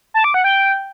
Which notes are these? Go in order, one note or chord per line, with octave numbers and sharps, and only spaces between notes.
A5
D6
F#5
G5